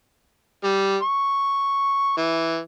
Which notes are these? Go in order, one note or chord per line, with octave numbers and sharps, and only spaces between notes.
G3
C#6
E3